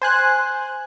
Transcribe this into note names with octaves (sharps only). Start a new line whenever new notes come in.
C5 G#5 F#6